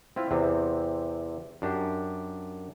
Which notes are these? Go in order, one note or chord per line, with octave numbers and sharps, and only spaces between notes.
C4 E4 F4
E2 C3 C4
F#2 D4 G4